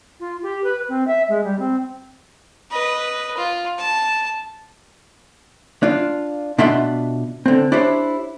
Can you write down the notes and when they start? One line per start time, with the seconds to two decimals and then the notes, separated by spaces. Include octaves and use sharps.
0.20 F4
0.42 G4
0.63 B4
0.88 C4
1.07 E5
1.28 G#3
1.43 G3
1.59 C4
2.71 B4 D#5
3.37 F4
3.78 A5
5.83 D4 F4
6.58 B2 D4 F4 E5 F#5 C6
7.46 D3 C4
7.72 D4 E4 G4 C5 C#5